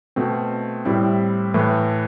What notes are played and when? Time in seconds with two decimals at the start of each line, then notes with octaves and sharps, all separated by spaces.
0.16 B2 A3 C4
0.85 A2 G3 C4 E4
1.54 A2 E3 A3